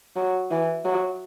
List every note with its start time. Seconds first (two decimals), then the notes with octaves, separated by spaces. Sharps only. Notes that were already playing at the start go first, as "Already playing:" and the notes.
0.16 F#3
0.51 E3
0.85 F#3